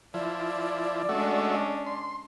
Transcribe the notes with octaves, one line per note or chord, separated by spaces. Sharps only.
F3 E4 D5
G#3 A3 C#4 D4 F#4 E5
C6